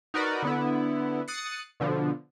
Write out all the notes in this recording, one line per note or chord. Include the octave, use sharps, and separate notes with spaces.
D#4 F#4 A#4 B4 D5
D3 B3 E4
D#6 F#6 A6 C7 C#7
B2 D3 F3